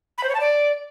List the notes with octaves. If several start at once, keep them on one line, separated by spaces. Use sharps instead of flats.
B5
C5
C#5
A5
D5